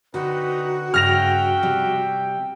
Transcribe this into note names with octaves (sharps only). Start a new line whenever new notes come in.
D3 C4 D#4 F#4 B4
G2 C#3 E5 G5 F6 A#6 F7
C3 G3